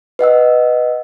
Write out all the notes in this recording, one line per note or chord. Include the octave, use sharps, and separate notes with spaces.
B4 D#5 F#5 E6